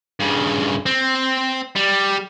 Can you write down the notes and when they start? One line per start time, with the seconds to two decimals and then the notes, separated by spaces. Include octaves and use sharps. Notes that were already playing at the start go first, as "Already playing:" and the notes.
0.20 G2 C#3
0.86 C4
1.76 G3